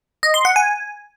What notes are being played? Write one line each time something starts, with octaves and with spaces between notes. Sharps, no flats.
D#5
C6
F#5
G#5